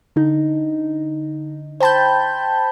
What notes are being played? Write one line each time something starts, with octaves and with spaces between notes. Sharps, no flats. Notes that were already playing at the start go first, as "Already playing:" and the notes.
D3 D#4
C5 G5 A5 B5 G6